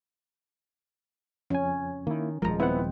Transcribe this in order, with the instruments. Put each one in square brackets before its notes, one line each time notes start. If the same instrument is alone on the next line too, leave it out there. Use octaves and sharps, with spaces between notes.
[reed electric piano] F2 G#5 [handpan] C#4
[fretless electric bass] D#3 [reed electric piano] A#3 E4
[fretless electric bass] D#1 A#1 F3 [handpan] G#3 [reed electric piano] A#4 A#5
[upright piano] B3 E5 [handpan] C4 [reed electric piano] E4 C5 F#5